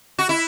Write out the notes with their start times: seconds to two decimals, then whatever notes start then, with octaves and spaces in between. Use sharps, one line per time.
0.19 F#4
0.29 E4